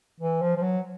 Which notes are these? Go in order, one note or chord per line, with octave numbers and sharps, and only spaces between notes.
E3
F3
F3
F#3